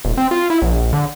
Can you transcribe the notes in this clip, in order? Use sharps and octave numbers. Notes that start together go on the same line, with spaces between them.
D#1
C4
F4
E4
A#1
D3